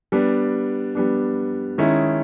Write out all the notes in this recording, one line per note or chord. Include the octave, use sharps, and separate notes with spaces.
G3 B3 D4
G3 B3 D4
D#3 G#3 C#4 E4